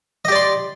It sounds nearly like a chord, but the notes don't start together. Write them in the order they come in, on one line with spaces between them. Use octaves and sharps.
D#5 G4 D5 C6